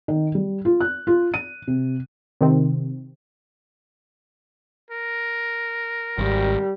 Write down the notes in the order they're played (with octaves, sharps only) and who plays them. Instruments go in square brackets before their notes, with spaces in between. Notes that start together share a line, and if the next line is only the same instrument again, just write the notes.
[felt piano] D#3
G3
F4
F#6
F4
D#7
C3
[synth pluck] C3 D#3 C4
[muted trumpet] A#4
[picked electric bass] G#1 [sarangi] G3